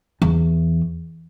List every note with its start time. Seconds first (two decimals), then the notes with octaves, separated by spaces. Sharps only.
0.22 E2